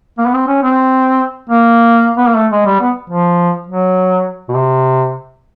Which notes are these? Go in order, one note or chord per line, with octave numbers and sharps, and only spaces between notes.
A#3
B3
C4
C#4
C4
A#3
B3
A#3
A3
G#3
G3
B3
F3
F#3
B2
C3